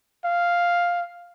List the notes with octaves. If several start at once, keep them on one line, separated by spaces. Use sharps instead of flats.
F5